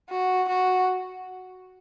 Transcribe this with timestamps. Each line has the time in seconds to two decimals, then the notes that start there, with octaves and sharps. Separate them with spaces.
0.10 F#4
0.49 F#4